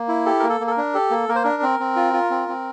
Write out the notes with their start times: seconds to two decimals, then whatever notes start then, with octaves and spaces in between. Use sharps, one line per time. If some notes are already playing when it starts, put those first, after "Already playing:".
Already playing: A#3
0.08 E4
0.26 G4 A4
0.40 A#3 A#4
0.49 A4
0.60 A#3
0.67 A4
0.71 A#4
0.77 D4
0.94 G4 A4
1.11 A#3
1.29 A#3 A#4
1.35 C5
1.43 D4 A#4
1.62 C4
1.80 C4
1.96 F4
2.13 F4
2.30 C4
2.48 C4